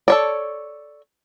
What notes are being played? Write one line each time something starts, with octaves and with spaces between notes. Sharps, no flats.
A4 C#5 D5